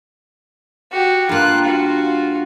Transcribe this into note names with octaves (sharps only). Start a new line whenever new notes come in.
F#4 G4
G2 A#3 F4 F#6
F4 F#4